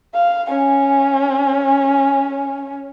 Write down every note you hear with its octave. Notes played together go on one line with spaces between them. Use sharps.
F5
C#4 G#5